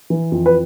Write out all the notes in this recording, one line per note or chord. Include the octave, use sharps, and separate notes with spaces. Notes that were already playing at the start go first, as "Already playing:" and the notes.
E3
F2
B4